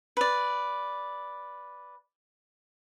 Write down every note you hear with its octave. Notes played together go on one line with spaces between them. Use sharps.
B4 D5